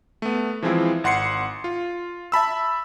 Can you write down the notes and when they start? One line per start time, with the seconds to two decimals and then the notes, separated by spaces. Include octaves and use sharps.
0.22 A3 B3
0.62 E3 F3 G#3 C4 E4 F4
1.04 G#1 F#5 C6 C7 C#7
1.64 F4
2.32 E5 A5 B5 E6